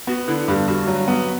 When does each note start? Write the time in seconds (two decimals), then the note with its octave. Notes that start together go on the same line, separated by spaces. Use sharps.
0.07 B3 F#4
0.28 D3 E4
0.48 G2 G4
0.68 G2 F#4
0.87 F#3
1.08 B3